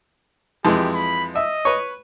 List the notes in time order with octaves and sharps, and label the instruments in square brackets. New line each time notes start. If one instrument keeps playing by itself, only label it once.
[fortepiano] F2 E3 G#3 [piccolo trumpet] G4
[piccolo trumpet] B5
[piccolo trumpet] D#5 [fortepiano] E5
[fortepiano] B4 C#5